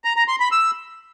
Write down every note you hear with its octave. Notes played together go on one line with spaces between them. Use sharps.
A#5
A#5
C6
B5
E6